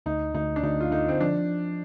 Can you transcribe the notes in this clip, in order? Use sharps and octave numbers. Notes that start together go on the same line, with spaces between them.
D2 D#4
D2 D#4
D4
D2 D#4
F4
D3 D#4
C4
F3 D4